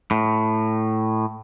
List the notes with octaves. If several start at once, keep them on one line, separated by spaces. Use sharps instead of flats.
A2